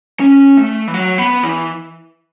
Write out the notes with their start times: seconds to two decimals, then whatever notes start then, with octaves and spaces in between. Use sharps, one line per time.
0.20 C#4
0.57 A3
0.88 E3
0.94 F#3
1.18 B3
1.43 E3